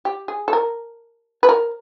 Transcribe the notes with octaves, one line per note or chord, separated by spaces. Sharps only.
G4
G#4
A4
A#4
B4
A#4